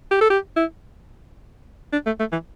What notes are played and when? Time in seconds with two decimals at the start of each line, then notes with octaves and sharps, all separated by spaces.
0.11 G4
0.21 A4
0.30 G4
0.56 E4
1.93 D4
2.06 A3
2.19 A3
2.32 E3